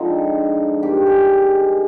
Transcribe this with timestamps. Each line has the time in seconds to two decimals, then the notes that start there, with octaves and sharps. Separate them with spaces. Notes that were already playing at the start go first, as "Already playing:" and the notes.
Already playing: D3 F3 G#3 C4 D#4
0.82 C3 D#3 G3 G4
1.07 G#4